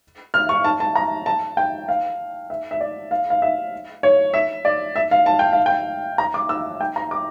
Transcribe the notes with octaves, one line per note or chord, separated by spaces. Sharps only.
F6
C#6
A5
A5
A#5
A5
G5
F5
E5
E5
D5
F5
F5
E5
C#5
E5
D5
E5
F5
A5
G5
F5
G5
A#5
D6
E6
G5
A#5
D6